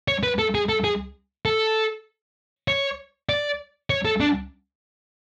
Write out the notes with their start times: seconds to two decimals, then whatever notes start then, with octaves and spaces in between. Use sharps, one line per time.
0.08 C#5
0.23 B4
0.39 A4
0.55 G#4
0.69 A4
0.84 G#4
1.45 A4
2.68 C#5
3.29 D5
3.90 C#5
4.05 A4
4.20 D4